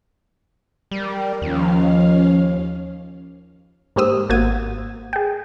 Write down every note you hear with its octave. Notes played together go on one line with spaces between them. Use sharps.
G3 A#4
D#2 F3 C#4 F5
G#2 A#3 G4 C5 D#6 E6
G#1 A#3 F#4 F#5 G#6 D#7
G#4 G5